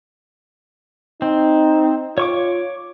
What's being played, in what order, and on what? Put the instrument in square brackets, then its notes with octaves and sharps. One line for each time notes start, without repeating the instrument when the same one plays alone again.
[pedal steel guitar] C4 [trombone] D#4
[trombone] F4 [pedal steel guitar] C#5 C#6 D6